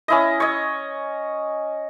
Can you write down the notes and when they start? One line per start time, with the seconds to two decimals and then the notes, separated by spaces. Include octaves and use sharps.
0.08 C#4 E4 D#5
0.40 C#5 D#5